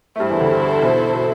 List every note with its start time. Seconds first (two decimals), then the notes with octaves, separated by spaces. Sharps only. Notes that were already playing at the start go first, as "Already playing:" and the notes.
0.16 A3
0.20 G2 G3 E4 A4 C5
0.30 E2 E3
0.40 D2 D3
0.51 G2
0.82 B1 B2
1.14 B2